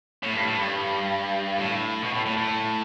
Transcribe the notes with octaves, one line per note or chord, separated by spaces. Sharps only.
A2
G2
A2
G2
A2
B2
A2
A2
A2